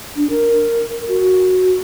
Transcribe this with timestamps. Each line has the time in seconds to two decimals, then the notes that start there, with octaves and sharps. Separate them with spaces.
0.16 D4
0.30 A#4
1.08 F#4